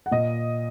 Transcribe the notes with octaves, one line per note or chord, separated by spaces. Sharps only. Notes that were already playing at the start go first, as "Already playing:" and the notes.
F#5
A#2 D#5